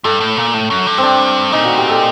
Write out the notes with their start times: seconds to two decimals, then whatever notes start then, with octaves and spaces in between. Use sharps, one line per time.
0.04 G2 A4
0.20 A2
0.37 A#2
0.54 A2
0.70 F#2
0.86 G2
0.98 C4
1.03 D4
1.52 A#2 D#4
1.65 F#4
1.77 G4
1.89 A4